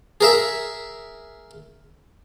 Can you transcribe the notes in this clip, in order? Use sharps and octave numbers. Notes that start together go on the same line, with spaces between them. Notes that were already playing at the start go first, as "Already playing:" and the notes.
G#4 A#4 E5